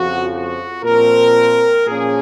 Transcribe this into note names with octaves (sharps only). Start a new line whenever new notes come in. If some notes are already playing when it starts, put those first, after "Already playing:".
Already playing: F2 C#3 F3 F#4
F#4
A#2 F3 C4 A#4
A#2 F3 A#3 C#4 G#4